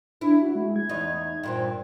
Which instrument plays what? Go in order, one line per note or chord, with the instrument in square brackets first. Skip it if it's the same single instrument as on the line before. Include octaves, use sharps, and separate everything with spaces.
[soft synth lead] D4 [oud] E4
[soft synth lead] F#4
G#3
G#6
[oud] E2 D#4
G2 A#2 C4